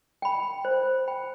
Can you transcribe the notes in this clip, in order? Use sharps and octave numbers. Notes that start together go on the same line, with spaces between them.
G5 B5
C5
G5 B5